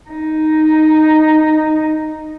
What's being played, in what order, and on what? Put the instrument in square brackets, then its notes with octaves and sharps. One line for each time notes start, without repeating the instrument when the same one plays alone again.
[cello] D#4